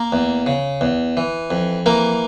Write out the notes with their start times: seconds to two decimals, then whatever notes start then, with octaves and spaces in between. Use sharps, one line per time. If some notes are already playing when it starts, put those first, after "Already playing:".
Already playing: A#3 A#4
0.12 E2
0.46 C#3
0.81 E2
1.17 E3
1.51 F2
1.86 E3 A#3 A#4